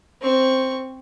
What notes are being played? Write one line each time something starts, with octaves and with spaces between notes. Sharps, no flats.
C4 C#6